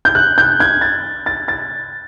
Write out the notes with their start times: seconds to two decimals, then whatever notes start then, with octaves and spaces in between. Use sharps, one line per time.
0.05 G6
0.15 F#6
0.38 G6
0.60 G#6
0.81 A6
1.26 A6
1.48 A6